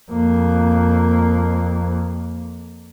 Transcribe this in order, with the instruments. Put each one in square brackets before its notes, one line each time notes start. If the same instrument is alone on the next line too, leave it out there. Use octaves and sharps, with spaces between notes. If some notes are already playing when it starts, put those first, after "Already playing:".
[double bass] F2 A#3